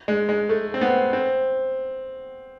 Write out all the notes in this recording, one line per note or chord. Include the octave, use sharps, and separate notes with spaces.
G#3
G#3
A3
C4
B3
C4